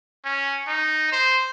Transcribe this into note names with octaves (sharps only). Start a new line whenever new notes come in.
C#4
D#4
C5